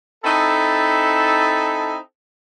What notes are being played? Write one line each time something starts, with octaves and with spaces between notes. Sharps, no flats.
C4 D#4 E4 A4